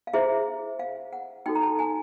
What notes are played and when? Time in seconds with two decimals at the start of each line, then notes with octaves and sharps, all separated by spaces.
0.07 F5
0.13 E4 G#4 C5 E5
0.79 F5
1.13 F#5
1.46 D#4 F#4 A4 G5
1.55 A#5
1.62 A5
1.79 G#5